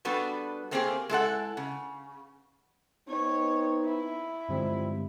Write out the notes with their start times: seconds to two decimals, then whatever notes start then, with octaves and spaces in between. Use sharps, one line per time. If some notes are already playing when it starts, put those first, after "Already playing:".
0.05 G3 B3 D4 F#4 A4 B4
0.71 A3 A#3 C4 F4 G4 G#4
1.09 G#3 E4 A4 F#5
1.57 C#3
3.09 B3 C4 D#4 C#5
3.85 E4
4.49 G2 D3 F3 G3 G#3 C4